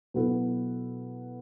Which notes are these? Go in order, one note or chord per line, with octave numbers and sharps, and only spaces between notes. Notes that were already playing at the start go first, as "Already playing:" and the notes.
B2 F#3 B3 E4 A4